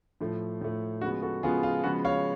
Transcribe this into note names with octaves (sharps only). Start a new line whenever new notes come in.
A2 F3 A3
A2 F3 A3
C#3 F3 G#3 B3 F#4
F#4 A4
C#3 F3 G#3 B3 F4 G#4
F4
C#3 F3 G#3 B3 F#4
C#5 F5